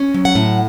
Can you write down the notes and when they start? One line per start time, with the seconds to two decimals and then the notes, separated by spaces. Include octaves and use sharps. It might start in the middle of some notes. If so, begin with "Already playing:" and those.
Already playing: C#4
0.14 F#3
0.25 F#5
0.35 A2